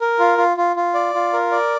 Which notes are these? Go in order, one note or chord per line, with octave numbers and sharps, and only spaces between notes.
A#4
F4
F4
F4
F4
D5
F4
A#4
D5